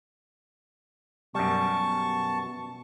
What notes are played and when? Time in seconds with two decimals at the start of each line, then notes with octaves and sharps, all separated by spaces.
1.35 F#2 B2 G3 A5 C#6